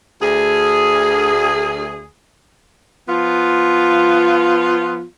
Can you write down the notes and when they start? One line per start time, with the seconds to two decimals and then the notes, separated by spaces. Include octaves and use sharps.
0.21 D2 G#4
3.08 F3 B3 F4